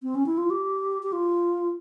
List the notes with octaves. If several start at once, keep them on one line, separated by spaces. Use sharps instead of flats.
C4
C#4
E4
F4
G4
G4
F4